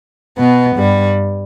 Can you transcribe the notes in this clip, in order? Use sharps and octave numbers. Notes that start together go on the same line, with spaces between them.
B2 B3
G2 G3